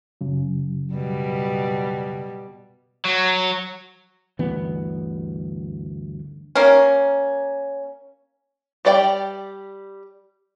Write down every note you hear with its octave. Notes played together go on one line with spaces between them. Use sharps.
F#2 C#3 F#3
B2 G3
F#3
G1 D2 E3 B3
A#3 C#4
G3 G4 D5 F#5 G5